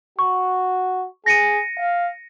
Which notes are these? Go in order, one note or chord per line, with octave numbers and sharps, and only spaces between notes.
F#4 C#6
G#4 A#6 C#7 D#7
F5